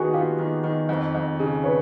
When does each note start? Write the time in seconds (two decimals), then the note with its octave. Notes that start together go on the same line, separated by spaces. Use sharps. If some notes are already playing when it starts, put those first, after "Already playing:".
Already playing: D#3 B3 F#4 G#4
0.13 B3 F4 G4
0.39 D#3
0.64 D#3
0.89 F2
1.15 F2
1.39 C#3
1.64 B4 C#5